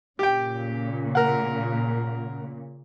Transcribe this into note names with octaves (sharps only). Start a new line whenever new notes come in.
A#2 C#3 G4 G5
A#4 F#5